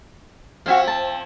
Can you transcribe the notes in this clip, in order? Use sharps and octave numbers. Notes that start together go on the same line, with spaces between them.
F3 C4 F#4 E5 F5
A5